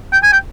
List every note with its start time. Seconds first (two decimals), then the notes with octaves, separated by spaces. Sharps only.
0.13 G5
0.23 G#5
0.33 G5